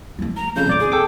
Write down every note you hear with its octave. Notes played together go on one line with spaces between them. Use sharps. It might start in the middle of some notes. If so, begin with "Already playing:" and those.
F3 A3
A#5
F2 C#3 G6
D1 G#1 D5 D6
G#4
A4 G5 D6